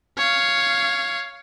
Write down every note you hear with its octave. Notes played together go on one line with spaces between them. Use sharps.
C#5 F5